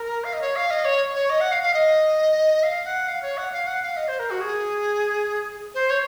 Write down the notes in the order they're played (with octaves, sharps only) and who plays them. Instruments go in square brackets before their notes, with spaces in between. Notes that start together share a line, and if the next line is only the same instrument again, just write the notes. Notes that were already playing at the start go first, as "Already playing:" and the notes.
Already playing: [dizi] A#4
F5
D#5
C#5
F5
D#5
C#5
C#5
D#5
F#5
F5
F5
D#5
F5
F#5
F5
C#5
F#5
F5
F#5
F5
D#5
C5
A#4
F#4
G#4
C5
C#5